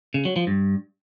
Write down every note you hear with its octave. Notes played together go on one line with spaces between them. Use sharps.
C#3
F#3
F3
G2